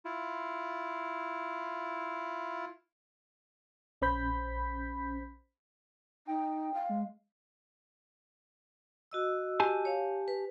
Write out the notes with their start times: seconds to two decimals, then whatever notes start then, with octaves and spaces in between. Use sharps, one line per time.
0.05 E4 F4
4.01 A#1 C#4 C5 B5 G6 B6
6.27 D#4 G5
6.74 F5
6.89 G#3
9.11 F#4 D#5 E6
9.60 G4 G#5 A5
9.85 C#5 F5
10.28 B4